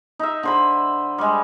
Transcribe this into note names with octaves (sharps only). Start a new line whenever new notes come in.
D#4 E5
D3 C5 B5
G3 G#3